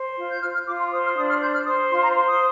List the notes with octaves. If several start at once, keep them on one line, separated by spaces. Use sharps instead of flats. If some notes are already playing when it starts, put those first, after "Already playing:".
Already playing: C5
F4
G6
F4 F6
F6
F4 D6
C6
C5 D#6
F6
D4 D#6
F6
C5 G6
F6
C5 D#6
F4 C6
A#5
C5 C6
D#6